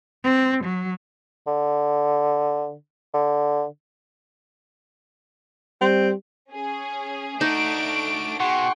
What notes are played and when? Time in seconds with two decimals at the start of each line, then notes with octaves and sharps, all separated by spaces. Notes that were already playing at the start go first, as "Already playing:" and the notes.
0.24 C4
0.64 F#3
1.47 D3
3.14 D3
5.81 G3 C4
6.51 C#4 G#4
7.41 A3 D4 D#4 F#4 D7
8.40 B2 G#4 F#5 G5 C6 C#6